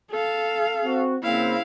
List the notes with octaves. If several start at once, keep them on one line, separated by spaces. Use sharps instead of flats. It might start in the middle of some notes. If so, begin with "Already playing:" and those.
A4 F5
C4 F#4
C#3 A#3 C4 E4 F5